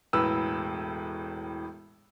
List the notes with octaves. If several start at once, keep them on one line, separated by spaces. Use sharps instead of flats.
E1 A2 B4 E6